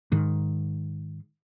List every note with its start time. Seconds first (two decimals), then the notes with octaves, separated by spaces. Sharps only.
0.12 G#2 D#3